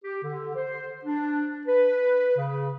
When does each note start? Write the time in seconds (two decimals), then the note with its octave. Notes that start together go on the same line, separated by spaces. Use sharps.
0.04 G4
0.23 D3
0.56 C5
1.05 D4
1.68 B4
2.37 C#3